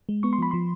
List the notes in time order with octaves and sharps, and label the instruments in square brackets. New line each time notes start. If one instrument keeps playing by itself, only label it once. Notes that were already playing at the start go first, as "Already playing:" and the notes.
[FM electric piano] G#3
B3 C#6
C6
F3 B5
F3 C6